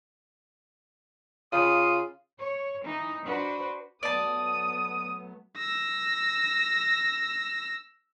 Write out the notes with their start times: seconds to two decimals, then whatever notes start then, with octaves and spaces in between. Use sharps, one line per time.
1.52 C#3 F4 D#6
2.40 C#5
2.84 E3 D#4
3.24 D4 F#4 B4 C5
4.03 F#3 A3 B3 D5 A5 D#6
5.58 E6 A#6